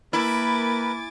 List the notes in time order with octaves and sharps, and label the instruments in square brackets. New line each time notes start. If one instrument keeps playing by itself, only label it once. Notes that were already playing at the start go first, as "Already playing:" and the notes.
[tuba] A#3 [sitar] E4 [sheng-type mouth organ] A#4 B4 [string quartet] G#5 D6 A6